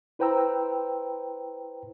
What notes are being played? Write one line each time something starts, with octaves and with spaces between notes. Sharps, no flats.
E4 B4 C5 G5 A#5 E6